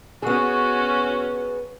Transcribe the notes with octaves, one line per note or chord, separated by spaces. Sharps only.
B3 C#4 F#4 G#4